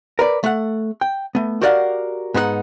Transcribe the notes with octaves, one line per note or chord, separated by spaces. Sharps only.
A#4 B4 D5
A3 F#5
G5
A3 B3
F#4 G4 A#4 D5 F5 F#5
G#2 B3 D#4 G4 F#5